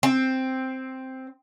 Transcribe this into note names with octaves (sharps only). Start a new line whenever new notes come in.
C4